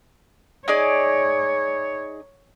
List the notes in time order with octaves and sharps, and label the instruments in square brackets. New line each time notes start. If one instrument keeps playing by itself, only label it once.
[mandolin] D#4 G#4 D5 [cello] C#5